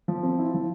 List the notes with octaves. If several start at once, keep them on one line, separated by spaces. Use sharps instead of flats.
F3
C4
E4
F3